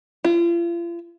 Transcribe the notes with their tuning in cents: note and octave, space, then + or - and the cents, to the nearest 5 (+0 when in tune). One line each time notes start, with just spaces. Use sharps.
F4 -40